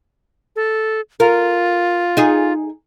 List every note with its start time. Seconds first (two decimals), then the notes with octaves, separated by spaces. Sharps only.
0.56 A4
1.20 F4 A#4
2.17 D#4 G#4